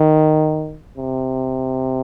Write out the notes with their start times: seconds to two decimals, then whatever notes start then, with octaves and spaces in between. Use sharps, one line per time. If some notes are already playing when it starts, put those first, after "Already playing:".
Already playing: D#3
0.98 C3